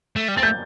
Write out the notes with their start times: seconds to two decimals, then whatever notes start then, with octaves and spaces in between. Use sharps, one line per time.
0.16 A3
0.28 G3
0.37 C4 A6
0.43 A3 G6